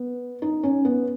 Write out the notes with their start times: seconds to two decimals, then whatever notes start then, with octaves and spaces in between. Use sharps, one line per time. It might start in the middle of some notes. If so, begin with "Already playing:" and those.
Already playing: B3
0.42 D#4
0.63 C#4
0.85 B3